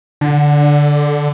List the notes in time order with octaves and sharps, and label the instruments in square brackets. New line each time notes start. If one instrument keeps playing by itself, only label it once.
[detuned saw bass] D3